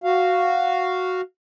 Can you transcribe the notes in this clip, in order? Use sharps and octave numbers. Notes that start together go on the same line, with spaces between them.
F#4 F5